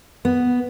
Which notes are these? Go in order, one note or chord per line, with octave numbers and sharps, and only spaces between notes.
B3